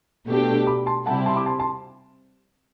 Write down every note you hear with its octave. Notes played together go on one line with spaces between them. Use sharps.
B2 A3 D4 G4
B5 D6
A5 C6
C3 G3 C4 E4 G4 F#5 A5
A5 C6
B5 D6
A5 C6
A5 C6